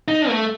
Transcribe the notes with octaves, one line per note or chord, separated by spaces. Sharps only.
D#4
A3